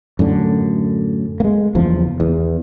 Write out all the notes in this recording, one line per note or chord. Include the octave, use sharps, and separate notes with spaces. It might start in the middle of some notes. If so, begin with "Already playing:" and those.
F#2 A2 D3
G#3 A#3
F#1 E2 F3
E2